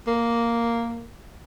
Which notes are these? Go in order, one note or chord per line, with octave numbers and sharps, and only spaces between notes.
A#3